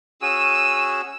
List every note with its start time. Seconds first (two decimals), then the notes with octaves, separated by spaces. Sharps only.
0.22 C#4 F#4 G#4 E6 D#7